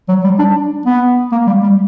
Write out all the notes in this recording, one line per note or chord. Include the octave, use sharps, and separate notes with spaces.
F#3
G3
D4
B3
A#3
G3
G3